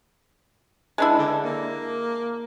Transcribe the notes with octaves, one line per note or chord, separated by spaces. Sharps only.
G#3 D4 E4
D3
A#3